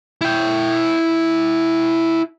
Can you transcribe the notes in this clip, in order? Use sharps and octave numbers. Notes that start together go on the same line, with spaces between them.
E4 G5